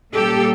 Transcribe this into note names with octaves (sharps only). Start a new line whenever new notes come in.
A#2 G3 A#3 C#4 G4 A4